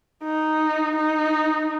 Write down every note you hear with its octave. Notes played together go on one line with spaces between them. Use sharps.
D#4
D#4